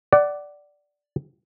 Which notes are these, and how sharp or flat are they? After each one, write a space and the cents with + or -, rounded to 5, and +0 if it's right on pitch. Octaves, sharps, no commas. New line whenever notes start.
D5 +0 F#5 +25